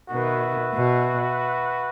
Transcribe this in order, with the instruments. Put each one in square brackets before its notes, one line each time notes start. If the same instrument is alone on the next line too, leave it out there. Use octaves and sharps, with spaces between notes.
[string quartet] B2 D#3 [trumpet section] F#4 B4 E5
[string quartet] B2